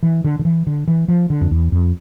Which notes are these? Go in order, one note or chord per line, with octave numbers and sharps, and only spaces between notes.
E3
D3
D3
E3
D3
E3
F3
D3
F2
E2
F2